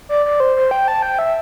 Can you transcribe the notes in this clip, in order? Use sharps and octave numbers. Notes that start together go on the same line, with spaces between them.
D5
D5
C5
C5
G5
A5
G5
E5